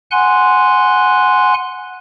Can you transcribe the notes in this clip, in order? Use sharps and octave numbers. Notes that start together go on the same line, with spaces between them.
F#5 G#5 C6 F#6